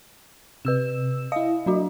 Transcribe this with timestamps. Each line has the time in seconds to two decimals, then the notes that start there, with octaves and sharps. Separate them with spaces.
0.65 C3 B4 E6 E7
1.32 E4 D#5 F5
1.66 F#3 D4 F#4